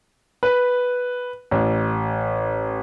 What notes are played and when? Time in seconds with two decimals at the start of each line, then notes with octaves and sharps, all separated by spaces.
0.43 B4
1.51 A1